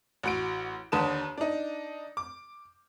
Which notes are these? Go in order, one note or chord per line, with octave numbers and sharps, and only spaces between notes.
A1 F#4 D7
D#2 D3 B4 A5 D#6 E7
D4 D#4
D6